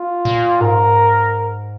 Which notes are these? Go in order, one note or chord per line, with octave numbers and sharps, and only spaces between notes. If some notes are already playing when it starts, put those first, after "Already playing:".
Already playing: F4
A#2
G#2 A#4